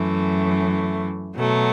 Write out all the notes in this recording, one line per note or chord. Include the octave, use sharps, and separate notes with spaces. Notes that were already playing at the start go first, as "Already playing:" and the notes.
Already playing: F#2 E3 A3
B2 F#3 A3